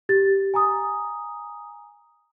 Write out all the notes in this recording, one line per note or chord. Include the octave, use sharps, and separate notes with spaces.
G4 A6
G#5 A#5 D#6